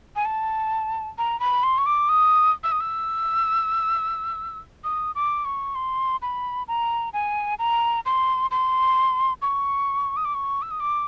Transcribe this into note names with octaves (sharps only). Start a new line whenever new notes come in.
G#5
A5
A#5
B5
C6
C#6
D6
D#6
E6
D#6
E6
D#6
D6
C#6
C6
B5
A#5
G#5
A#5
C6
C6
C#6
D#6
D6
C#6
E6
D#6
D6